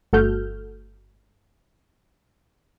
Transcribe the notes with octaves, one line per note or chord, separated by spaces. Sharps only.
G1 A3 F#4 A4 F6 G6